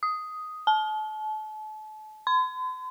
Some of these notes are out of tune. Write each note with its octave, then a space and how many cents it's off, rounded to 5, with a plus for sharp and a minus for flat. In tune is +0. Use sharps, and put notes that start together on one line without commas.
D#6 +5
A5 -35
C6 -45